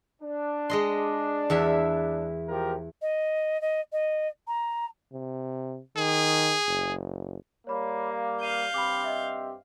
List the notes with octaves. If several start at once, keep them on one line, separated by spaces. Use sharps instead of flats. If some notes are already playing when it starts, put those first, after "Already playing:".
D4
G#3 D#5 C6
E2 E4 E5
F3 G4 A#4
D#5
D#5
D#5
A#5
C3
D#3 G#4
F#1
G3 A#3 C#5 B5
F5
F5 G6 D#7
G2 C4 G4 B5 D6
D#5 E5